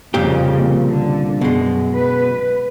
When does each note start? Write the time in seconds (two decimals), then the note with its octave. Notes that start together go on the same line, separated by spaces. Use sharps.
0.14 C2 F2 A#2 C#3 A#3 G4
0.86 D3
1.41 F#2 B2 G#3
1.95 B4